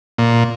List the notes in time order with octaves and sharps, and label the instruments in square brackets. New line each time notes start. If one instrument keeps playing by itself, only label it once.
[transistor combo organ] A#2